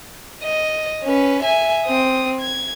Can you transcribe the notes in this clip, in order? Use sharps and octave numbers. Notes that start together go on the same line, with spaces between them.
D#5
C#4 B4
E5 G#5
C4 D#6
G#6